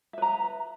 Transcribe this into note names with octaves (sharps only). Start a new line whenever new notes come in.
B4 E5 A#5